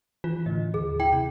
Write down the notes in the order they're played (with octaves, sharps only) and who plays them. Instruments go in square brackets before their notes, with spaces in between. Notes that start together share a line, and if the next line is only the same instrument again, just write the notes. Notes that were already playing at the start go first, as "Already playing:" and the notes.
[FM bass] E3 [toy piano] F4
[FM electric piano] A2 D3 [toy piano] D#5
[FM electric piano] D#2 [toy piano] G#4
[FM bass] E4 [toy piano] G5
[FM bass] C3